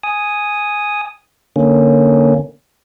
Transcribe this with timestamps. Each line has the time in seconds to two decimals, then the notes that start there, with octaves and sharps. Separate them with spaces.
0.03 G#5 D#6
1.56 D3 A#3 C#4